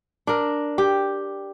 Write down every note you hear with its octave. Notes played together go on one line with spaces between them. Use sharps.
D4 A#4
G4